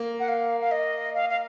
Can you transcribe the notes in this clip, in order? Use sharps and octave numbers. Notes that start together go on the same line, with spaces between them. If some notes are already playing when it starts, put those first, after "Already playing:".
Already playing: A#3
F#5
F5
F5
D#5
F5
F5